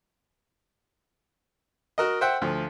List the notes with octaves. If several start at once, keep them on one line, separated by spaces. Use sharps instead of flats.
F#4 A#4 D#5
C5 E5 F#5 G5
D2 F3